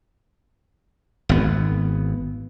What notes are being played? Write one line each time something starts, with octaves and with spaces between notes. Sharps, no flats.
G#1 B3